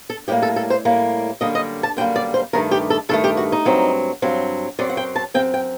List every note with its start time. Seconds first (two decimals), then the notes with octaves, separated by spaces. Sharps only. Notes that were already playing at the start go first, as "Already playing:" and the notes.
0.10 A4
0.28 A2 G3 A#3 G4
0.42 A4
0.56 A4
0.70 C5
0.85 A2 G3 A#3
1.41 F#2 D3 G3 A#3 D#5
1.55 D#5
1.83 A5
1.97 F#2 D3 G3 A#3 G5
2.16 D5
2.34 C5
2.53 G2 D#3 A3 A#4
2.71 G4
2.90 A4
3.09 G2 D#3 A3 A4
3.24 G4
3.37 F#4
3.52 D#4
3.65 G2 F#3 C4
4.22 G2 F#3 C4
4.79 F#2 F#3 C4 D5
4.90 F#5
4.97 G5
5.16 A5
5.34 F#3 C4 G5
5.38 F#2
5.54 G5